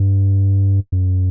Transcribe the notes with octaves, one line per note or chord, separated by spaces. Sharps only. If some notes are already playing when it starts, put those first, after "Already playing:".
Already playing: G2
F#2